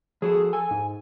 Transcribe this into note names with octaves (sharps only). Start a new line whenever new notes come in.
F3 F#4 G#4 A4
A4 G#5
G#2